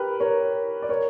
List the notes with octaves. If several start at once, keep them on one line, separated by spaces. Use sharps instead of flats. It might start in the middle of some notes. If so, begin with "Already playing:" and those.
Already playing: G4 A#4 B4
A#4 C#5
D5
A#4 C#5